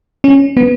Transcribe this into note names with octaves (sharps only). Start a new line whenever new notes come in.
C#4
B3